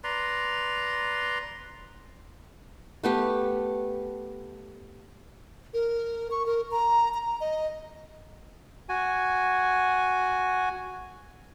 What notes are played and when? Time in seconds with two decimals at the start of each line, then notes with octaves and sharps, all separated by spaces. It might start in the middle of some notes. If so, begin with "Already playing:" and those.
0.04 B4 D5 A#5 C6
3.03 A3 B3 G4
5.74 A#4
6.31 C#6
6.46 A#4
6.71 A#5
7.14 A#5
7.40 D#5
8.89 F#4 G#5